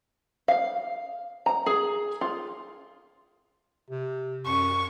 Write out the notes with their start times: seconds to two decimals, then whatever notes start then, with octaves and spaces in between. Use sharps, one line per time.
0.48 F5
1.46 A#5
1.66 G#4
2.21 F4
3.90 C3
4.46 F#2 C#6